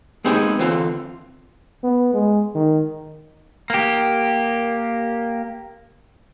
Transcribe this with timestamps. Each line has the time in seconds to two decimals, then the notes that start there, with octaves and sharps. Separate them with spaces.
0.25 G#3 B3 C4 D#4 G4 G#4
0.59 D3 E3 C4 F4
1.84 B3
2.14 G#3
2.55 D#3
3.70 A#3 G4